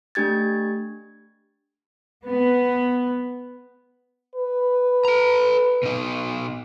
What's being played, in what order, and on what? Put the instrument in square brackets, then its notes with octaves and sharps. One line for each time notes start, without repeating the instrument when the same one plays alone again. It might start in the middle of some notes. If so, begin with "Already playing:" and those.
[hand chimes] A3 D4 G4 G#6 A6
[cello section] B3
[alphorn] B4
[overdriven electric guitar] A4 A#5
B2 D#4